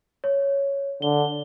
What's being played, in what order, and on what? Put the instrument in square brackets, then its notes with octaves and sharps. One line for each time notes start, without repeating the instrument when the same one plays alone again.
[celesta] C#5
[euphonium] D3 [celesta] G7